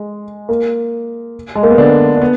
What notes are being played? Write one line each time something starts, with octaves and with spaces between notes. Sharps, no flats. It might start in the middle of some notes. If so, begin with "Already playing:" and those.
Already playing: G#3
A#3
G#3
A#3
B3
D3 D4
D4
B3